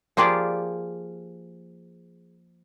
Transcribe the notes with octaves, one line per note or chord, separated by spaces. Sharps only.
F3 A#3 F4 G4 G#4 D5